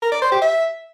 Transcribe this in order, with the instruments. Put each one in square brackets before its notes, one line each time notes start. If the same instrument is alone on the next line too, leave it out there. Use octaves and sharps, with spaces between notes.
[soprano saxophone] A#4
D5
C5
G4
E5